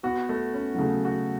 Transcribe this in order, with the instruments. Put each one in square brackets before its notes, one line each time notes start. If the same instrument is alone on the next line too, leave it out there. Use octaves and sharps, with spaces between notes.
[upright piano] B3 [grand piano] F#4
[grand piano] A3
C#4
[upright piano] F#3
[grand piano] C#3 [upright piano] A3
[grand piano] F#4